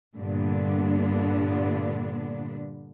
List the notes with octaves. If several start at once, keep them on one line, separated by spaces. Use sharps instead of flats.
G2 A#2 D3 B3 D4